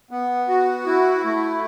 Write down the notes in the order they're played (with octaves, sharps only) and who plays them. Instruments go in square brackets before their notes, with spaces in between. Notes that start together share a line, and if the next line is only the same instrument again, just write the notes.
[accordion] B3
F#4
E4
A3